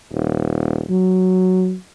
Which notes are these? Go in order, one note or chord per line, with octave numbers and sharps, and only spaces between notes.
D#1
F#3